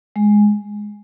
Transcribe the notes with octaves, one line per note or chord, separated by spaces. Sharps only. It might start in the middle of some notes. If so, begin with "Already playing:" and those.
G#3